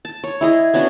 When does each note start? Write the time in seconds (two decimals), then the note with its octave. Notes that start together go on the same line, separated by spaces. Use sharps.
0.05 A5
0.24 C#5
0.41 E4 G#4 D#5
0.74 B3 C#4 D4 F#4